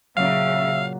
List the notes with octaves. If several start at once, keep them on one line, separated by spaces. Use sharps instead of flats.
A#2 C#3 F#3 E5 F5